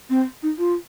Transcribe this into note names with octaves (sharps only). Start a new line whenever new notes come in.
C4
D#4
F4